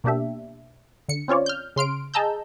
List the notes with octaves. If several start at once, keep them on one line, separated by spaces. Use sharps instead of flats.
B2 A#3 D4 G4 E5
D3 C#7
C4 C#4 F4 C#5 D5
F6 G6
C#3 C6 F6 D7
G#4 D#5 A5 A#5 E6 G6